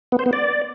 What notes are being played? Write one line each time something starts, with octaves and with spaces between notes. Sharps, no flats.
B3
C5
B3
D5